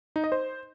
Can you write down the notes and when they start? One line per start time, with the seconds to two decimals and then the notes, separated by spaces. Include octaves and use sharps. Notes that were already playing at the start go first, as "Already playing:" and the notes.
0.16 D#4
0.24 D#5
0.32 C5